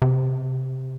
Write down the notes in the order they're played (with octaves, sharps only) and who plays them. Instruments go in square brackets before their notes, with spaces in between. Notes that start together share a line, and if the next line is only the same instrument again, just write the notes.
[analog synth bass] C3